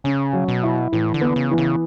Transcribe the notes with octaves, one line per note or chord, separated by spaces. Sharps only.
C#3 C#4
F#3
B2
E4
A2 E3
D3
B3
C#3
E3
C#3